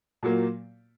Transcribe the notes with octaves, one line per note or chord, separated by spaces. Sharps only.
A#2 F#3 A#3